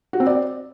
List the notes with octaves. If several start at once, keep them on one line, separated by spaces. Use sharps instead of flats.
F#4
C4
D5